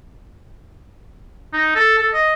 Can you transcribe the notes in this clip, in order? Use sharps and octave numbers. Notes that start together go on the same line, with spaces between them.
D#4
A4
A4
D#5